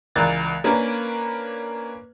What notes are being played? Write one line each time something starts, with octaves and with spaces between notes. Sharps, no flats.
C#2 E3 A#4 D5 F#6 A6
A#3 C#4 D4 A#4 B4